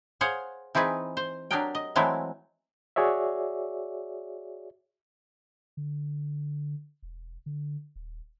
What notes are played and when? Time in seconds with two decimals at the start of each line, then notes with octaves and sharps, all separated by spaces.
0.21 G#4 C5 C#5 F5 F#5
0.75 E3 C4 D#4 G#4 B4
1.17 C5
1.51 F#3 D4 G4 G#4 A#4 G5
1.75 D#5
1.96 E3 F#3 G#3 A3 C4 E4
2.96 F#4 G#4 C#5 D5 E5
5.77 D3
7.02 E1
7.46 D3
7.96 D#1